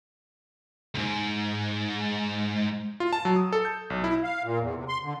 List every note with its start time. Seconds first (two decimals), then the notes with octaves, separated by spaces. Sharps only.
0.95 D2 G#2
3.00 F4
3.13 A5
3.25 F#3
3.36 D#6
3.53 A4
3.65 G6
3.90 B1
4.04 E4
4.23 F5
4.44 A#2
4.59 E2
4.75 C3
4.88 C6
5.03 D3